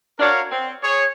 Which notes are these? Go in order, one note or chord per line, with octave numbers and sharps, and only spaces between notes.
D4 F#4 A#4 C#5 F5
C4
G#4 C#5